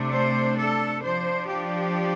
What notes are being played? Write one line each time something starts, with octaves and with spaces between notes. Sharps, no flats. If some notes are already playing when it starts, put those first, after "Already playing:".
Already playing: C3 A3 D4
C5
A4
F3 D4 C5
G4